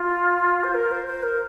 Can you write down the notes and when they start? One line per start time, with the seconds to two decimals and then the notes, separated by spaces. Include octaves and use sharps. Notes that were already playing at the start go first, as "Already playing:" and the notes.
Already playing: F4
0.64 C5
0.74 A#4
0.91 C5
1.07 C5
1.23 A#4